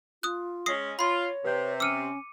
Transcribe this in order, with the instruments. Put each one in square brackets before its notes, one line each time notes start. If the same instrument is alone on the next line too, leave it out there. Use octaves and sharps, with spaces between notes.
[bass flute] F4 [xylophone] D#6 F#6
[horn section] G#3 C#4 [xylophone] D#6 C7 [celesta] A#6
[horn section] F4 [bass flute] C#5 [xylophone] B5 C6
[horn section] C3 [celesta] B4 G6
[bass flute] C#4 [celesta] D6 C#7 D#7 [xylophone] E6 F6